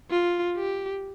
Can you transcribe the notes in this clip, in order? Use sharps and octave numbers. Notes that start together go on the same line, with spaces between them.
F4
G4